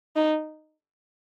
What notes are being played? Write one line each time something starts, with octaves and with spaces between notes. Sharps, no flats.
D#4